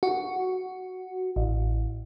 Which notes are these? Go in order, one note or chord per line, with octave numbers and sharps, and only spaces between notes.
F#4
A1